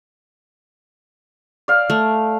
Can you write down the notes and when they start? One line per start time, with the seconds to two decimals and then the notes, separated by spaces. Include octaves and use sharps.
1.68 D5 F5
1.90 A3